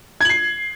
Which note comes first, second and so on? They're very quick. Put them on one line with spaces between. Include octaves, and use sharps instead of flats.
G#6 F#7 C7